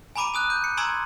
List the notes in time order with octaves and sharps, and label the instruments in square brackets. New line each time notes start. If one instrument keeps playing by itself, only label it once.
[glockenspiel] G#5 A#5 B5 D6 D7 D#7
G#5 D#6 F#6
G6 D#7
C#7
G#5 A#5 C6 D6 E6 G#6